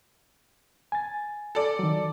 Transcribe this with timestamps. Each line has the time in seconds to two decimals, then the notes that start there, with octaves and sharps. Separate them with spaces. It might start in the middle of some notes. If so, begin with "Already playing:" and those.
0.92 G#5 A6
1.55 A4 D5
1.79 D#3 F#3